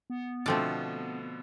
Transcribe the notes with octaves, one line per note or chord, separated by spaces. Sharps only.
B3
B2 D3 F3 A3 C4 D5